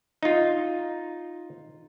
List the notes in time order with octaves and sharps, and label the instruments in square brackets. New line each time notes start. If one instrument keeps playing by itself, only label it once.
[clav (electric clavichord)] D#4 F4